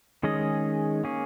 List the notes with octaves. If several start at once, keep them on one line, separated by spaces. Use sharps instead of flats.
D#3 G#3 C#4 G#4 D#5
A#3 C#4 G#4